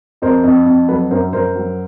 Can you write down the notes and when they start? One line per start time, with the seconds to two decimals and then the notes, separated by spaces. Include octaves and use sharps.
0.22 F2 A#4 C5
0.44 F2
0.66 F2
0.88 F#3 A4 B4
1.11 F#2 A#4 C5
1.33 F#2 A#4 C5
1.55 F#3